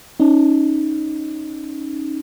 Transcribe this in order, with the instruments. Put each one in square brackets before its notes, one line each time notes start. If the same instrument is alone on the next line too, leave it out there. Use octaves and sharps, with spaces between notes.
[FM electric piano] C#4 D#4